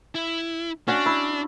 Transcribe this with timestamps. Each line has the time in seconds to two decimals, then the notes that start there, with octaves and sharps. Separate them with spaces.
0.15 E4
0.88 C#4 D4 F#4
1.06 E4